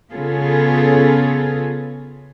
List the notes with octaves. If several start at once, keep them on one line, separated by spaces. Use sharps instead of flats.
C#3 B3 F4 G#4 A4